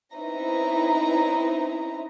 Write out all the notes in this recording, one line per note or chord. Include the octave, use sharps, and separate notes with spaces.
C4 C#4 D#4 E4 B4 A#5